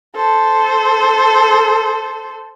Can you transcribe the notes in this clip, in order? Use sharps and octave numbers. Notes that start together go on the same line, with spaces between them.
A4 C5